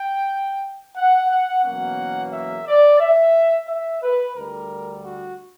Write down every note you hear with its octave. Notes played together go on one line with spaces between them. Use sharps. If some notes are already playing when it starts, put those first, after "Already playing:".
Already playing: G5
F#5
F#5
E2 B2 F#3 A#3 C#4 F#5
E5
D5
E5
E5
B4
D2 D3 G3 A#4
F#4